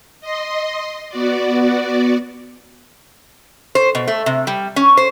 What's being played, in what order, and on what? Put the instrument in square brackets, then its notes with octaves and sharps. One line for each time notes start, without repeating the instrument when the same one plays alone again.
[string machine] D#5 C6
B3 F#4 D5
[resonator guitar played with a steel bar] C5
B2
A3
C3
G3
C#4
C5